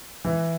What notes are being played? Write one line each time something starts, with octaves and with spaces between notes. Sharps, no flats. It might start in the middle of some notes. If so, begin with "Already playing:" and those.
E3